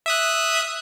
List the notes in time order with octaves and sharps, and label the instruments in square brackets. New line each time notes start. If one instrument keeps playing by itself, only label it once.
[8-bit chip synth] E5 D#6 F#6